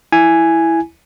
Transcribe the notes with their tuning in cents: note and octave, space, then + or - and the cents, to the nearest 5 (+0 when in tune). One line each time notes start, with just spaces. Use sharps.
E4 +0 G#5 +0